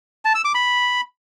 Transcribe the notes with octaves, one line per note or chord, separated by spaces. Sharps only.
A5
E6
D6
B5